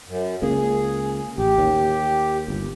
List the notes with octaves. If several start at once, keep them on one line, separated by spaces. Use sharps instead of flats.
F#2
C#2 C#3 A#3 G#4
A1 G4
D#2
G1